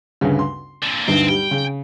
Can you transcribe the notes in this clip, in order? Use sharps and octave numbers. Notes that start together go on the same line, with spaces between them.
D2 G2 C#3
C6
A#2 D3
D2 G2 C4 D#4
G3 G5
C#3